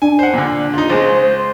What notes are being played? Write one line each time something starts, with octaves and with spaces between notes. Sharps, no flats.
D4 G#5
C5 F#5
A#2 D3
D#4 F4
C#2 G#3 C5
C5